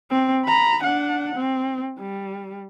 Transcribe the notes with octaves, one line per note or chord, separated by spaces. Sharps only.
C4
A#5 B5
D4 F#5
C4
G3